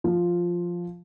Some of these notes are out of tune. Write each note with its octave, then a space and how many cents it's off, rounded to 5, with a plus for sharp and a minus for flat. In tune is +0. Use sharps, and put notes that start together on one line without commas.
F3 +0 F4 +5